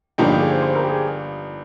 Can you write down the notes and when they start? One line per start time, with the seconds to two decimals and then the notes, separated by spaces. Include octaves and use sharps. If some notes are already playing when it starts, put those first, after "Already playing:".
0.18 G1 G2 F3 A#3 D#4 G4
0.29 G4
0.39 G#4
0.51 C5
0.61 C5
0.75 A#4
0.83 G4
0.89 G#4